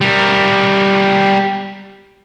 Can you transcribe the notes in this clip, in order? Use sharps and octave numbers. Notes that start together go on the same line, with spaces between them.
G3 A#4